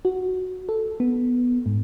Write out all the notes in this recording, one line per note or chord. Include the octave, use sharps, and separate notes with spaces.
F#4
A4
B3
G#2